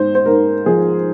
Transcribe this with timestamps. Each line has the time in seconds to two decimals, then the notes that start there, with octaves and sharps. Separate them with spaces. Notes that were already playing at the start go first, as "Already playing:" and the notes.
Already playing: G#2 G#3 C5
0.15 C5
0.26 G#2 A#4
0.66 F3 G#4